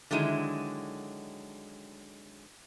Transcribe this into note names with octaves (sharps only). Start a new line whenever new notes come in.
D3 D#3 F#3 G#3 E4